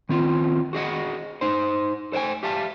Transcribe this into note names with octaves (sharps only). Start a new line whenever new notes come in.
D#3 C4 F4
F#4 G#4 D#5 F#5
D#4 C5
A4 C5 C#5 G5 G#5
G4 E5 F5 A5